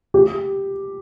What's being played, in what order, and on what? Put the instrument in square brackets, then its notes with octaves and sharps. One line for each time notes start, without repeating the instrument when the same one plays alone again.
[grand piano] G4